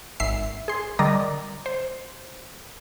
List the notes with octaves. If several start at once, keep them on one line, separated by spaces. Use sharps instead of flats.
G#1 E5 C7
G#4 C6
D3 G3 A#4 D5 D#5 A#5
C5